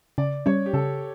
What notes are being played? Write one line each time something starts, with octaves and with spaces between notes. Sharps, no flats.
C#3 D5
G3 C#4 C#5
G4
C#3 A4